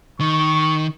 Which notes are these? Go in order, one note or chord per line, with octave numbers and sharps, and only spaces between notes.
D#3 C#6